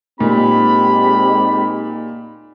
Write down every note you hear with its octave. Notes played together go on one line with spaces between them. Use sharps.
A#2 G#3 C4 D#4 G4 B5